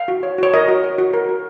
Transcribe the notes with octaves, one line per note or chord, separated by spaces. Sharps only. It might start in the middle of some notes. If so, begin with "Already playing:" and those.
Already playing: F5
F#4
C#5
F#4 C#5
A#4 D#5
F#4
C#5
F#4
A#4
F#4